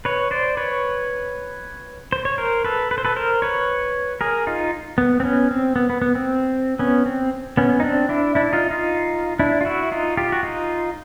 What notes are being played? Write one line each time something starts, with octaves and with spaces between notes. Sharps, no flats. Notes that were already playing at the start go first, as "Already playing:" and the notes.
B4 C#5
C5 D5
B4 C#5
C5
C#5
A#4 C5
A4 B4
B4
C5
A4 B4
A#4 C5
B4 C#5
G#4 A#4
D#4 F4
B3
C4
B3 C#4
C4
B3
B3
B3
C4
B3 C#4
C4
B3 C#4
D#4
C4 D4
D4 E4
D4 E4
D#4 F4
D#4 F4
D4 E4
F4
E4 F#4
D#4 F4
F4 G4
F#4
D#4 F4